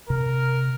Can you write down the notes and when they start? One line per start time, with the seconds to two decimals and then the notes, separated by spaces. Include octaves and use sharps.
0.09 C3 A#4